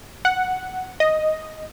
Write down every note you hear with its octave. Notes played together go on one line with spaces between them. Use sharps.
F#5
D#5